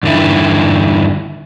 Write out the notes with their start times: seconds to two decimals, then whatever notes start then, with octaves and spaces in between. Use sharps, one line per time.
0.03 E2 G2 D3 D#3 E4